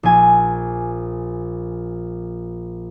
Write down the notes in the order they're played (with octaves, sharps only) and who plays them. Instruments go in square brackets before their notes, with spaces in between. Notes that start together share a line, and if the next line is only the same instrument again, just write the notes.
[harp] A#1 G#5